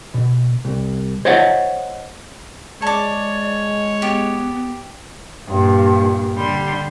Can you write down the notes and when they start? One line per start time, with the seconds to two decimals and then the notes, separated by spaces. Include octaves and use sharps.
0.14 B2
0.65 C2
1.25 C5 C#5 D#5 F5 F#5
2.82 G#3 C#5 D5 A5 D6
4.02 B3 G4
5.48 G2 A#2
6.35 D3 G3 C6